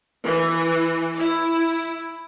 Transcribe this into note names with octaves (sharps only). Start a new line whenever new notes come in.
E3
E4